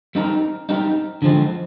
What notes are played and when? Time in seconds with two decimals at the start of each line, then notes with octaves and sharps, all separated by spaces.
0.15 G3 C4 D#4 G4 A#4
0.69 G3 C4 D#4 G4 A#4
1.22 D3 F3 G#3 C4